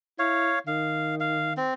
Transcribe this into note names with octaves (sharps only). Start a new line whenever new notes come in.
E4 C#5 F5
D#3 F5
F5
C4